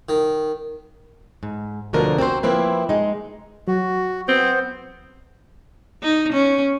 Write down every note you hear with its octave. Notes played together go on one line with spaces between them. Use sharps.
D#3
G#2
D2 B2 D3 F3 A#4
C4 F#4 A4 C5
F3 A#3 C4 E4 B4
G#3 D#4
F#3 F#4
B3 C4 C5
D#4
C#4